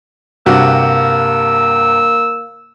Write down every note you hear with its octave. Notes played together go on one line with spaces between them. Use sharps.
G2 C3 A#3 F#4 E6